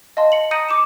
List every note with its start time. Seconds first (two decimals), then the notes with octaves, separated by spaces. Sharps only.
0.17 D#5 F5 A5 C6
0.32 C#7 F#7
0.51 A#5 D#6 G6 A#6 C#7 D#7
0.69 D6 C#7 E7